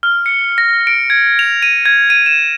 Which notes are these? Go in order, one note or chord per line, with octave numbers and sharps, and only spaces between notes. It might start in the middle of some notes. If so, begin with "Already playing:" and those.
F6
C#7
A#6
D7
G#6
F7
D#7
G#6
D#7
E7